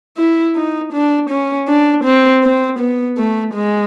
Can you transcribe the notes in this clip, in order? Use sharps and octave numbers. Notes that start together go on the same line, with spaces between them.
E4
D#4
D4
C#4
D4
C4
C4
B3
A3
G#3